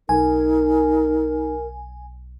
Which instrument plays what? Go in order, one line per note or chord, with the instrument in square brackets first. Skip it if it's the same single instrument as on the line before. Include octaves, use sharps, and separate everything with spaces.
[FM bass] B1 [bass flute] D#4 [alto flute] A#4 [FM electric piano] G#5